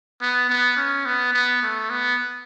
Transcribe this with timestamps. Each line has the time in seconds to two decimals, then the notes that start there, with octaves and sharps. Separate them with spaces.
0.21 B3
0.49 B3
0.77 C#4
1.05 B3
1.33 B3
1.63 A3
1.90 B3